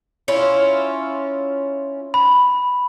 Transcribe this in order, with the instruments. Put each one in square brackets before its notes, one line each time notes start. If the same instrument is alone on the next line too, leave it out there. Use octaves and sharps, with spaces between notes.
[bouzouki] C#4 E4 F4
[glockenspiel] B5